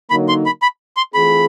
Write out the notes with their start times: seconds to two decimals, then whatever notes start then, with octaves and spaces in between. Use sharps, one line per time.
0.10 D3 F#3 A#3 D#4 B5
0.29 C6
0.46 B5
0.62 B5
0.97 C6
1.14 E3 A3 C4 F4 G#4 B5